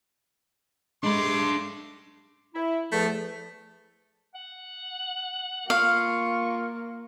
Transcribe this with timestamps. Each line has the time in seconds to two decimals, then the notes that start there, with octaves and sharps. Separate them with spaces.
1.04 G#3 A3 D4 B5 C6 D6
2.54 E4
2.92 E2 F3 A3
4.35 F#5
5.70 A#3 F4 F5 C#6